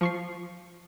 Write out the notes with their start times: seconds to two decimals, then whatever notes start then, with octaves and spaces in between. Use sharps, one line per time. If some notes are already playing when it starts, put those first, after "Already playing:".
0.01 F3 C#6 C7